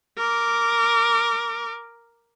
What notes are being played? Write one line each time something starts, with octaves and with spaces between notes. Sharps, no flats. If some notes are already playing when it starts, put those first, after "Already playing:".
A#4 D6